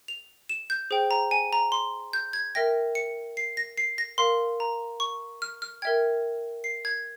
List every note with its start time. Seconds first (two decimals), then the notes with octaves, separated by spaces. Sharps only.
0.08 F7
0.49 E7
0.70 G6
0.91 G#4 C5 G5
1.11 A#5
1.31 G#5
1.53 A#5
1.72 C6
2.13 G6
2.33 G#6
2.55 A#4 E5 G5 A#6
2.95 C#7
3.37 C7
3.57 A#6
3.78 C7
3.98 A#6
4.18 A#4 F5 C6
4.60 A#5
5.00 C#6
5.42 F6
5.62 F6
5.82 A#4 E5 G5 G#6
6.64 C7
6.85 G#6